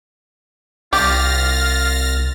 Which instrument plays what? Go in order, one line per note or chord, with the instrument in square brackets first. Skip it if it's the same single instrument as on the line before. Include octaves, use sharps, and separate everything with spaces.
[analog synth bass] C2 [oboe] F4 [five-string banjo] G4 [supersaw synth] F6 A6 A#6